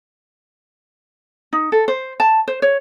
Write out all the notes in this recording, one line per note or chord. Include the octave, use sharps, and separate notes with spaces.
D#4
A4
C5
A5
C5
C#5